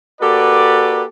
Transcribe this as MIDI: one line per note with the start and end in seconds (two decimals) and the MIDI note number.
0.21 1.04 58
0.21 1.04 66
0.21 1.04 67
0.21 1.04 69
0.21 1.04 71
0.21 1.04 74